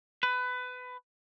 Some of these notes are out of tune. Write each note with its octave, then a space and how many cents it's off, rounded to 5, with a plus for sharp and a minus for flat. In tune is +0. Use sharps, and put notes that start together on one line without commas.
B4 +20